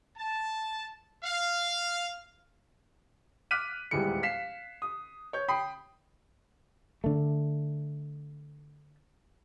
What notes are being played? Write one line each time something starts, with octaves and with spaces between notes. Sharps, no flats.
A5
F5
D6 F6 F#6 B6 D#7
D#1 E2 E3 G3 G#3 C#7
F5 B6 C7 E7
D#6
C#5 G6
G5 B5 D#6 C7
D3 A3